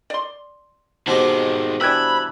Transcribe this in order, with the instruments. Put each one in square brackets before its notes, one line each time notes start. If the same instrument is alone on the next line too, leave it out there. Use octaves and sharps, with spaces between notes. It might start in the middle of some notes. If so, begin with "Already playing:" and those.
[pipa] D5 C6
[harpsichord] B2 C4 G4 [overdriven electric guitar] D#3 G#3
[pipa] E3 G3 D4 [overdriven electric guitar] B5 [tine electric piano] E6 F#6 G#6